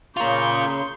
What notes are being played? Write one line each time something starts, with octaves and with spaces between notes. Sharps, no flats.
C#3 F4 A#4 C6 C#6 G6